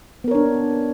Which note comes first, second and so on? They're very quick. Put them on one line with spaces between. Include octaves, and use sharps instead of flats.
B3 A#4 C#5 D4